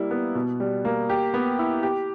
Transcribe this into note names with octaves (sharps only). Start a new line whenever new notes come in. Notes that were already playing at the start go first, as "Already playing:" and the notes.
Already playing: G3 A#3 E4
B3
B2
G3
A#3
G4
B3
E4
G4